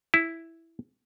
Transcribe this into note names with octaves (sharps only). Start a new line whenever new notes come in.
E4